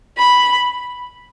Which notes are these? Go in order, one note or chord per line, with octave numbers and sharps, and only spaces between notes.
B5